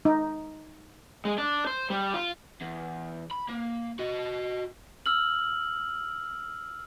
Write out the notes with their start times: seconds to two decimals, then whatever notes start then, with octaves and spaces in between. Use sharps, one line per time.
0.05 D#4
1.25 G#3
1.38 D4
1.67 C5
1.90 G3
2.14 F4
2.61 E2
3.31 B5
3.49 A#3
3.99 F#4 D#5
5.06 E6 F6 F#7